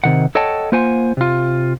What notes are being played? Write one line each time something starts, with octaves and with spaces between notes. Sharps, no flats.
C3 D#3 F#5
A4 C#5 D#5 F#5 G5 A5
A#3 F4 C5 F#5 G#5
C3 F4